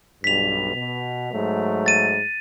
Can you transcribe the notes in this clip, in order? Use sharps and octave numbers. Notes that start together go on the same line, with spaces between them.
B1 G2 B6 F7
B2
G#2 F#3 A3
A6 D#7